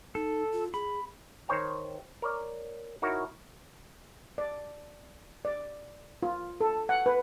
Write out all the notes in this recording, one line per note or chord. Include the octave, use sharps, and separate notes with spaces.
D#4 A4
F4
G#4 B5
D#3 C5 C#5 G5 A#5
A#4 C#5 D5
D#4 E4 F#4 A#4 C#5
D5
D5
F4
A4
F#5
B4